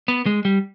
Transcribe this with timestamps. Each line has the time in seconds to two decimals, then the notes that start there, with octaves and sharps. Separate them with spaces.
0.08 B3
0.26 G#3
0.45 G3